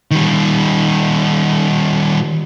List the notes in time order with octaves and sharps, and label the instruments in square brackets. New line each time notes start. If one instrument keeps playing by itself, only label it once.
[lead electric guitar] D#3 G3